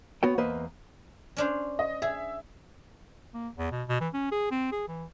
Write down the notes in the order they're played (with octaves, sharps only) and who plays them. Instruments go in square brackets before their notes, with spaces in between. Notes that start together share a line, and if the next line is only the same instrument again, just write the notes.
[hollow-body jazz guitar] B3 F#4 C#5 G5
E2 A#3 B4 C5 D#5
[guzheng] C#4 D4 C5
[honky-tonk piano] D#5
[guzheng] G#4 [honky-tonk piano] E5
[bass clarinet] A#3
E2
B2
B2
E3
C#4
G#4
C4
G#4
E3